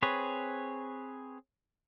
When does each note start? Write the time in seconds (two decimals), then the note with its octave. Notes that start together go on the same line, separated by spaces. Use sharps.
0.02 C4 G#4 B4 C#5